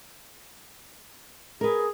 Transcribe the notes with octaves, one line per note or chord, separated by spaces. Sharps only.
G#4 A#4 B4